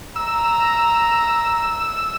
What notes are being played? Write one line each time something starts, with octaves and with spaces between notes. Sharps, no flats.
A#5 E6